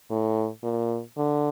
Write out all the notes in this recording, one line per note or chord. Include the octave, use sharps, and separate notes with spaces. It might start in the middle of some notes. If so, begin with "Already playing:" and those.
A2
A#2
D3